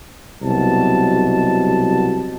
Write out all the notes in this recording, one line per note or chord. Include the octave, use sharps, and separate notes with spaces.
C2 B2 F#3 A5